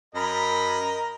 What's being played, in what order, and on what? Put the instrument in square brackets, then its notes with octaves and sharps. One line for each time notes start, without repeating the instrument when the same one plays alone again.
[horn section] F#2 B5 [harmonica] A#4 D#5